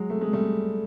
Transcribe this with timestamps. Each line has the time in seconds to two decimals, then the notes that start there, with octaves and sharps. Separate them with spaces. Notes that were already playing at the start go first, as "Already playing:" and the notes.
Already playing: F#3 G#3
0.10 A3
0.21 G#3
0.33 G3 A3